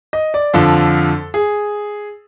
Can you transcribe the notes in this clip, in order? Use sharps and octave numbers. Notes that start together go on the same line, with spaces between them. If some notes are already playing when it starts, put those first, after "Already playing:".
D#5
D5
F2 D3 F3 A4
G#4